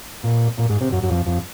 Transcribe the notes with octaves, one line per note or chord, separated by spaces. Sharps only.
A#2
A#2
G#2
C3
F#2
F#2
F2
F2